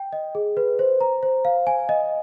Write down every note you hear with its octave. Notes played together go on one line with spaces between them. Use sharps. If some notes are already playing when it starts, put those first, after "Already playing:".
Already playing: G5
D#5
G#4
B4
C5
A#5
C5
F5
G#5
D#5